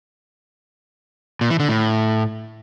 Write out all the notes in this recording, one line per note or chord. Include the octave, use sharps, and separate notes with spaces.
A#2
E3
D3
A2